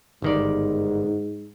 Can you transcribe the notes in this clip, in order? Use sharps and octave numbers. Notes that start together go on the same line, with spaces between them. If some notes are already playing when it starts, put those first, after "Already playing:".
G1 G#2 D#3 D5